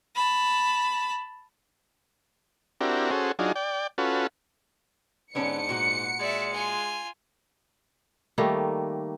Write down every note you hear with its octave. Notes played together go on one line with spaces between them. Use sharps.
A5 B5
C4 D4 E4 F#4 G4 A#4
C#4 F#4 G#4 A4 C5
F#3 D4 D#4 F4 G#4
D5 G5
C#4 F4 F#4 A4 B4
G#2 D3 B3 C#4 C#7
A#2 F#4 F#5
G#3 D5 E5
F4 G#5
D#3 G3 A3 A#3